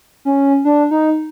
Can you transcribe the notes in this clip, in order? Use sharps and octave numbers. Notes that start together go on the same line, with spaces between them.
C#4
D4
D#4